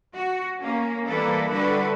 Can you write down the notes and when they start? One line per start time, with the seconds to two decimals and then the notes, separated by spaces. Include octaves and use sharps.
0.13 F#4
0.58 A#3 C#4
1.07 E3 G3 A#3 E4 A4 B4
1.49 D3 G3 E4 F#4 A4 B4